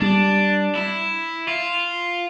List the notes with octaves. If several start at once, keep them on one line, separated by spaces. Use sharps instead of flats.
G3 D4
E4
F4